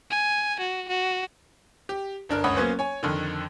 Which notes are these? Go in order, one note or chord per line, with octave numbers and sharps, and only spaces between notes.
G#5
F#4
F#4
G4
G1 D4 A#4
F#1 C#2 C#5 F#5 B5 D#6
F#3 A#3 B3 C#4 B4 C5
C#5 G#5
F2 D3 D#3